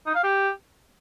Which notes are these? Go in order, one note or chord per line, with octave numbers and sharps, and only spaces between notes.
D#4
F5
G4